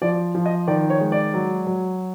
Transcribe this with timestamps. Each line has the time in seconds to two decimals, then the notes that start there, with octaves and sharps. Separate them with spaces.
0.02 F3 D5
0.35 F3
0.46 D#5
0.67 D#3 D5
0.90 C#5
1.00 G#3
1.12 D5
1.34 F#3
1.67 F#3